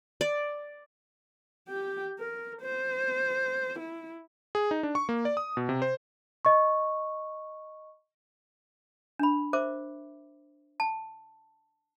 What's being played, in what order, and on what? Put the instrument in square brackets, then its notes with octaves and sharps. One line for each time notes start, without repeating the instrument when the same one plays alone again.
[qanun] D5
[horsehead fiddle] G4 G5
A#4
C5
E4
[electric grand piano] G#4
D#4
D4
C#6
A#3
D5
D#6
B2
C3
C5
[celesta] D#5 C#6
[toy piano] D4 B5
A#4 C5 E5 D6
A5